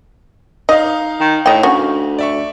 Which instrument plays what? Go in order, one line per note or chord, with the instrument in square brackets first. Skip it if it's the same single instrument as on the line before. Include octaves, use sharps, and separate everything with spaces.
[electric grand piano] D#4 F5 [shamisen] D#5
[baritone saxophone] D#3
[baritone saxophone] A2 [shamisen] D#5 G5
[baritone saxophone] D2 [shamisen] C#4 F#4
[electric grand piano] D5 E5 C#6